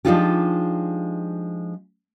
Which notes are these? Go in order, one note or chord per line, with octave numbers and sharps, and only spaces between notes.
F3 G#3 D4 D#4 F4 G4